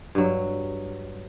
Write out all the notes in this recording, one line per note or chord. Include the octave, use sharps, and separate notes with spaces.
G2 F#3